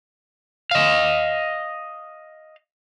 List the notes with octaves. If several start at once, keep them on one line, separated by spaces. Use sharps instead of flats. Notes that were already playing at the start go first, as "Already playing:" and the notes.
D#5 F5